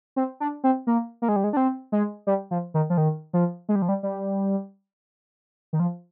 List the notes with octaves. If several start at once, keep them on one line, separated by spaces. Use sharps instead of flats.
C4
D4
C4
A#3
A#3
G#3
G3
G#3
D4
C4
G#3
G3
F3
D#3
F3
D#3
F3
G#3
G3
F3
G3
G3
D#3
F3